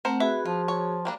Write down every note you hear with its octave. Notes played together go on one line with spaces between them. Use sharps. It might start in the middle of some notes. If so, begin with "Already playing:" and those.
A3 C4 A#4 C5 F#5
F#4 G#4 B4 E5
F3 F4
C#5
G3 A#3 D4